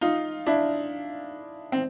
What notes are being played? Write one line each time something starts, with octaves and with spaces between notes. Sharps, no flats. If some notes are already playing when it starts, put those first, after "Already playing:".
D#4 F4
D4 E4
C4